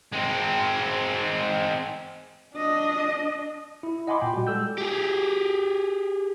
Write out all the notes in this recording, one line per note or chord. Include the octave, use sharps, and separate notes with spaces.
G#3 C4
D4 D#5
E4
D#5 F#5 G#5 B5 C6 D6
A#2 G5
G3 F#4
G#3 A4 E6 G6
G4 G#4